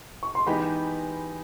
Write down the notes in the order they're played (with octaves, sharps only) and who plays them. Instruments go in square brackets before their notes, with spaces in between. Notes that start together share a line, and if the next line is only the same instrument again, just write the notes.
[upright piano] C#6
C6
[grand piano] E3 G#3 B3 D#4 G4 [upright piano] B5